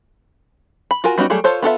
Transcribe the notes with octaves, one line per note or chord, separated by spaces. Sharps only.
B5
F4 F#4 A#4 G#5
G3 B3 C#4 D#4 F#4
F#3 G3 A3 G#4
F4 A4 C5 C#5
B3 F4 A4 E5